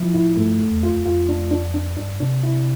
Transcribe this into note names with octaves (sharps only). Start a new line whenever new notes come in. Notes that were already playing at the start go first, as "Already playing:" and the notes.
Already playing: F3 E4
A2 E4
G2 A3
A3
E2
F2 F4
F2
F2 F4
D4
D4
D4
G2 D4
C3 D4
E4